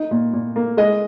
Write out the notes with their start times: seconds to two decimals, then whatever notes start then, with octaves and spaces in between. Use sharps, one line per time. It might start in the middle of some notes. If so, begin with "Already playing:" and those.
Already playing: D#4
0.11 A#2
0.33 A#2
0.56 A#3
0.77 G#3 D#5